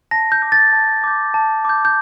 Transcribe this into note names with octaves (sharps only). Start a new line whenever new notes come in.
A5 A#6
G6
D6 G6
A6
A5
D6 G6
A5
D6 G6
G6